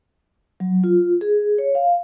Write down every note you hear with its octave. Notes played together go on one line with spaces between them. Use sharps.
F#3
F4
G#4
C#5
F5